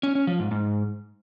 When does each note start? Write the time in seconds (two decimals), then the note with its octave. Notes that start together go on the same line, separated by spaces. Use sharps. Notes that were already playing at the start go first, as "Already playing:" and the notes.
0.03 C#4
0.15 C#4
0.27 F3
0.39 G#2
0.51 G#2